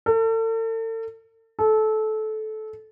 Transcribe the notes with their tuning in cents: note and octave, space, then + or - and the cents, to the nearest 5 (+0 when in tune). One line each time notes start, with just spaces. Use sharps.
A4 +40
A4 -20